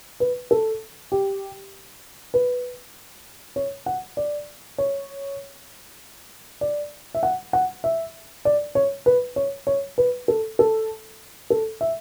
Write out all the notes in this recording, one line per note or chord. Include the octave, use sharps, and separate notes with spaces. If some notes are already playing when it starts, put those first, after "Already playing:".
B4
A4
G4
B4
C#5
F#5
D5
C#5
D5
E5
F#5
F#5
E5
D5
C#5
B4
C#5
C#5
B4
A4
A4
A4
E5